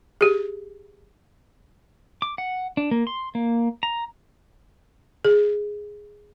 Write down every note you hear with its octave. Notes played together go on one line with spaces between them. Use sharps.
G4 G#4
D6
F#5
D4
A#3
C6
A#3
A#5
G#4